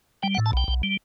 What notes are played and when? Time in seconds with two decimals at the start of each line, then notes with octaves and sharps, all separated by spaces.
0.23 G3 G5
0.35 F#5
0.38 A2
0.46 A5
0.53 B1 G5
0.68 B1
0.83 G3